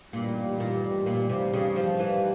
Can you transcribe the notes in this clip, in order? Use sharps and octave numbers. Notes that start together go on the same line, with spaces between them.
A1 G2 A#2 D#3 G3
A#2
A#2
C3
C#3
F3
E3